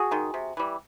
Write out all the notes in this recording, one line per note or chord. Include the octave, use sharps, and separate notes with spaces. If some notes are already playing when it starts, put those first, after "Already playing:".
Already playing: F#4 G#4
D#3 G#3
C3
E3 G3